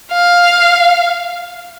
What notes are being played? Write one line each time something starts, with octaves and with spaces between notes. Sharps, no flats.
F5